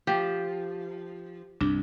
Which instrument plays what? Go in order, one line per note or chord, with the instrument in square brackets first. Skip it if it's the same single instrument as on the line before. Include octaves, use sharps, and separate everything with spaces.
[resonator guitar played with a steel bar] F3 [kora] G4
[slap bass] C2 G2 [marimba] D4